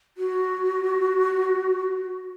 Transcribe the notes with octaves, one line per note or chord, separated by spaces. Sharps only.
F#4